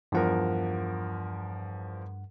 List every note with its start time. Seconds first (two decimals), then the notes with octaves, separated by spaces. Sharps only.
0.12 E2 G2 F3 A#4 F#5